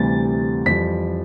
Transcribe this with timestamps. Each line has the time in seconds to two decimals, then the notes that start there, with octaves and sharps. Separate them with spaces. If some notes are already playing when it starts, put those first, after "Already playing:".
Already playing: D2 C3 E3 G3 A6
0.66 F2 E3 G3 B6